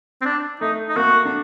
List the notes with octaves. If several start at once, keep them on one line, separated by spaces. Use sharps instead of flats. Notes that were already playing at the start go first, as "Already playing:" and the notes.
C4
D4
A3 D#4
D#4
A#3 F#4
D4